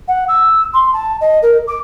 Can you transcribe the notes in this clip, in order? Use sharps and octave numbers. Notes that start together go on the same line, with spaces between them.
F#5
E6
C6
A5
D#5
A#4
D6